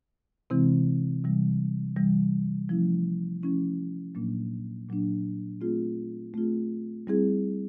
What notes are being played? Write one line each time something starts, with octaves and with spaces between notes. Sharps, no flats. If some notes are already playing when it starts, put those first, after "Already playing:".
C3 E3 G#3 C4 E4
C3 E3 G3
C3 E3 G3
F3 A3 C#4 E4
F3 A3 C#4 E4
A#2 F#3 A#3 D4
A#2 F#3 A#3 D4
A3 C4 F4 G#4
A3 C4 F4 G#4
G3 C4 E4 G#4